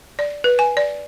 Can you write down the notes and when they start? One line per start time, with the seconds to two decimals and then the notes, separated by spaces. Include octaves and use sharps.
0.19 D5
0.44 B4
0.59 G#5
0.77 D5